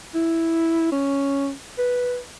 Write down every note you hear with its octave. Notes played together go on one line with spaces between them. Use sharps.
E4
C#4
B4